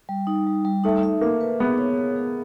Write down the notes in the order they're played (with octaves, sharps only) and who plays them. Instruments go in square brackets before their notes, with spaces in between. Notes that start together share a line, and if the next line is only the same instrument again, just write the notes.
[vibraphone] G3
D#4
G3
G3
[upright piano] A3 [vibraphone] D#4
[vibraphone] E5
[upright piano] A#3 [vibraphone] E5
[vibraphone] B4
[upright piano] B3 [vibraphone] G#4
[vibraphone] C#5
G#4
G#4